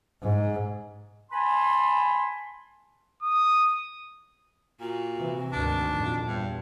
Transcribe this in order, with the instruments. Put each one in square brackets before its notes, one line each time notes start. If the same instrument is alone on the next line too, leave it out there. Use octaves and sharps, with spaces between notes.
[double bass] G#2
[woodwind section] G#5 A5 B5 C6
[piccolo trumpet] D#6
[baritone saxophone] A#2 [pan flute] F#4
[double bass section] C3 E3
[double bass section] G#1 D2 D#3 [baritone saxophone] D4
[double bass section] A#1 F2
[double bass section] E2 [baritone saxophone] G2